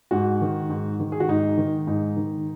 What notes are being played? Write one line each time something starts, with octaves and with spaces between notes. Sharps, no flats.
G#2 F#4
D#3
G#2
D#3
G#4
F#4
G#2 D#4
D#3
G#2 D#4
D#3